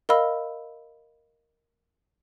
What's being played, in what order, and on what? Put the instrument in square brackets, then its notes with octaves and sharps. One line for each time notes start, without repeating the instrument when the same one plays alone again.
[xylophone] A#4 D#5 F5 B5 E6